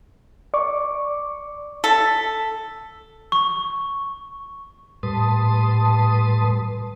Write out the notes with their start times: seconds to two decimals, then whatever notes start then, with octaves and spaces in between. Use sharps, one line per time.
0.54 D5 C#6 D6
1.84 A4 B6
3.32 C#6
5.03 A2 G3 B4 A5 C6 D#6